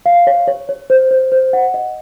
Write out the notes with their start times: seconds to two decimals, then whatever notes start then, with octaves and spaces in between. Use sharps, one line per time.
0.06 F5
0.27 C#5
0.47 C#5
0.69 C#5
0.90 C5
1.11 C5
1.32 C5
1.53 F#5
1.74 D#5